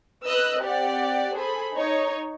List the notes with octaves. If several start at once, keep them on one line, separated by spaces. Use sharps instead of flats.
B4 D#5 E6 F#6
C4 G4 D5 F#5
G#4 A4 C5 B5
D#4 C#5